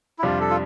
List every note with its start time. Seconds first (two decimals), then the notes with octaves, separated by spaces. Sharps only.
0.19 E4
0.23 F2 C3 G3 D4 F4
0.40 A4
0.50 F4